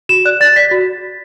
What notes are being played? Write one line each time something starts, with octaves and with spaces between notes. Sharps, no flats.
F#4 E7
D5 F#6
D5 A6
D5 B6
F#4